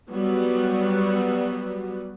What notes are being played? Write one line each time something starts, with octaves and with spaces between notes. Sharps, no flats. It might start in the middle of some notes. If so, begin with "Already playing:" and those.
F#3 G3 B3